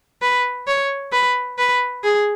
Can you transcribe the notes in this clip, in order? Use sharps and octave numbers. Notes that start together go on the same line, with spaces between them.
B4
C#5
B4
B4
G#4